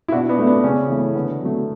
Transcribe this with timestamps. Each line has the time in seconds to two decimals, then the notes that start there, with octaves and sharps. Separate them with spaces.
0.08 E4
0.12 B2 D4 F#4
0.29 B3 D4
0.39 A3
0.47 B3 D4
0.64 C#3 C#4
0.89 E3 A3
1.15 D3 B3
1.41 F#3 A3